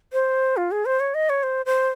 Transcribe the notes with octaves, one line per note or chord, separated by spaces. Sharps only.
C5
F4
G#4
C5
C#5
D#5
C#5
C5
C5